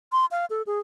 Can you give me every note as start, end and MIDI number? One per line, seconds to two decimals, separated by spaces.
0.12 0.26 84
0.31 0.45 77
0.50 0.62 69
0.67 0.79 68